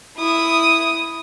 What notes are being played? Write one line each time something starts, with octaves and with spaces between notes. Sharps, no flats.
E4 D#6